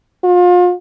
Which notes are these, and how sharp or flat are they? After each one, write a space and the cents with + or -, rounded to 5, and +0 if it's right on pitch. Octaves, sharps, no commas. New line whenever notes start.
F4 +35